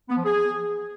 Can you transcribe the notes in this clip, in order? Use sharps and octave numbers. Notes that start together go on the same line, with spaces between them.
B3
F3
G#4